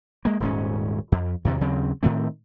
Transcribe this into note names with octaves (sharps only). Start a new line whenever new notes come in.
G#3 A#3
D#1 G#2 C#4
F2
E2 G2 C3 D#3
D#2 C#3 F#3 C4
A2 D#3 A3 C4